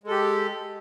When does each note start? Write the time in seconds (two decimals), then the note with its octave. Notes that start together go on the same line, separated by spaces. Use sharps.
0.04 G#3
0.07 A4
0.11 G4